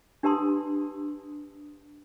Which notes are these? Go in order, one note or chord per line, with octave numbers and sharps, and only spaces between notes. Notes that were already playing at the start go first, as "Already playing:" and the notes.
D4 G4 B4 A5 C6 D#6